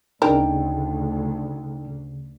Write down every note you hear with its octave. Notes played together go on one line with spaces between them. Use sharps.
D2 C#3 D4 D#4 A#4 G5